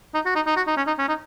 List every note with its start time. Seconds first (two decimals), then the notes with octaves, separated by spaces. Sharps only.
0.14 D#4
0.26 F#4
0.35 D#4
0.47 D#4
0.57 F#4
0.67 D#4
0.77 C#4
0.87 D#4
0.99 C#4
1.08 D#4